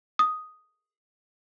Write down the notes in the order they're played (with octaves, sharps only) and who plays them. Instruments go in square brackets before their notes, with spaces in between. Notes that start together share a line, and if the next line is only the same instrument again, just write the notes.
[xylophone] D#6